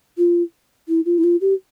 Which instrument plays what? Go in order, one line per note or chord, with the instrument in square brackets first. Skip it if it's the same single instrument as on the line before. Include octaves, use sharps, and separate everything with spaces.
[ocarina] F4
E4
F4
E4
F4
G4